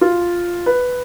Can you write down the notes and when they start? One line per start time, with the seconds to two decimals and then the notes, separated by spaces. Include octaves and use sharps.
0.01 F4
0.66 B4